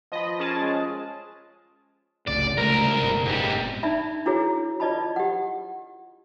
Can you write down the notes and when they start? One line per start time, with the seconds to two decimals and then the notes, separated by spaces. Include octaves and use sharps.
0.12 F3 D#5 B5
0.39 C#4 G#4 A#4 A5
0.61 G#3
2.27 F1 C#2 A2 D5
2.58 C2 C#3 G#3 A3 A#4
3.02 F#1 B2
3.25 G#2 G3
3.83 D4 D#4 D5 E5 B5
4.26 D4 E4 F#4 G#4 C#5
4.80 F4 D5 D#5 A5 B5
5.16 G4 F#5